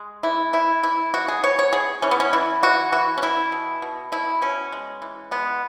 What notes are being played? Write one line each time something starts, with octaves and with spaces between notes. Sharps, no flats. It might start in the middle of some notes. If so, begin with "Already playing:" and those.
Already playing: G#3
E3 E4
E3 E4
E3 E4
B3 F#4
G#4
B3 C#5
C#5
B3 G#4
E3 C#4
B3
C#4
E3 E4
E3 F#4
E3 F#4
C#4
E3 E4
B2
B2
B2 E4
B2 C#4
G#3
E3
G#3 B3